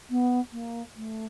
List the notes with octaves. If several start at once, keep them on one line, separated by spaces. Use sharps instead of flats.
B3
A#3
A3